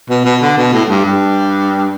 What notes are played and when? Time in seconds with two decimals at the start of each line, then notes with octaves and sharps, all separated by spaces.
0.10 B2
0.25 B2
0.42 D3
0.57 B2
0.73 A2
0.89 G2
1.05 G2